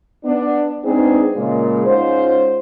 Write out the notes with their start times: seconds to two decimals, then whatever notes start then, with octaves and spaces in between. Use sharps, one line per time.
0.25 B3 D4
0.85 G#3 B3 C4 D4 D#4 G#4
1.35 A#2 C#3 G#3
1.85 G#2 C#4 F4 C5